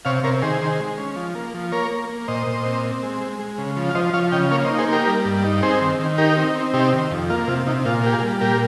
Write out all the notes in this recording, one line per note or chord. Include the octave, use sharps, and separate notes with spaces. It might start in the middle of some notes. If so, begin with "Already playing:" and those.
C3 C#5 F5
C3 A#4 C#5
D#3 G#4 C5
D#3
G#3
C#4
F3
A#3
F3
A#3 A#4 C#5
A#3
A#3
A#2 C5 D#5
A#2
C4
C4
G#3
G#3
G#3
C#3
F3
F5
F3 C5 D#5
F3 C#5 F5
C#3 D#5 G5
A#3 C#5 F5
C5 D#5
D#4
G#4 C5
A#3 G4 A#4
G3
G2
D#4
C4 G#4 C5
D#3
D#3
D#4 G4 A#4
C4
C4
C3 D#4 G4
D#3
F2
A#3 F4
C3 F4
C3 D#4
A#2 F4
A#3 G4
F4 G#4
G3
A#2 G4 A#4